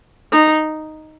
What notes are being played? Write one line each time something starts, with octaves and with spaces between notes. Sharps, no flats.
D#4